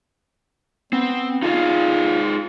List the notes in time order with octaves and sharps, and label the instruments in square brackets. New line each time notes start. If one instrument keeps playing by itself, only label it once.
[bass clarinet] B3 [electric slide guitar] C4
[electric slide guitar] D#4 G#4 F5 [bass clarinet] F4